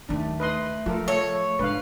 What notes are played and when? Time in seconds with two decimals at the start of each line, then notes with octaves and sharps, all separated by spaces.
0.09 D#2 D#3 A3 D4
0.40 B4 D#5 C6
0.86 F3 F4 A4 A#4
1.08 A4 C#5
1.59 G#2 D3 B4 F5